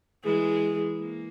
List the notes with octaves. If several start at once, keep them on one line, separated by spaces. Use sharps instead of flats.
E3 G#3 G#4
A#3